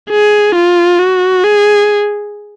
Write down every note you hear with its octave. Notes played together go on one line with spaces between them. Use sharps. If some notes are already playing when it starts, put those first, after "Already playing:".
G#4
F4
F#4
G#4